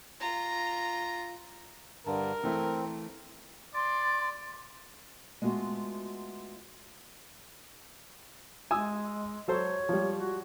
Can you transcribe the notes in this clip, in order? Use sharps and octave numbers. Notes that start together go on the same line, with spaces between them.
F4 A#5
G2 D3 A#4 A5
E3 A3 C4 E4
D5 C6
G#3 A3 B3 F4 F#4 D#5
G#3 G#5 D#6 E6
F#3 A4 C5 C#5
F3 G3
F#4